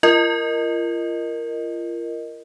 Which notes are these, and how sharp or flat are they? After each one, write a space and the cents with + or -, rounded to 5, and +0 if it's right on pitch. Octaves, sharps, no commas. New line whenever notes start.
F4 -35 A#4 +0 D#5 -10